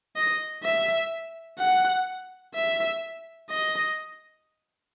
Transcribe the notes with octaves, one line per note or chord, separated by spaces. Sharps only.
D#5
E5
F#5
E5
D#5